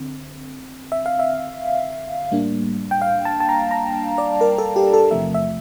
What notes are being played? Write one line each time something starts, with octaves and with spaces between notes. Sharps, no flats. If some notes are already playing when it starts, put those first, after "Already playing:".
Already playing: D3 C4
E5
F5
E5
A2 G3 A#3 D4
G5
F5
A5
A5
A#5
A#5
D5
A#4
A4
G4
A4
E2 C3 F3 A3 E5
E5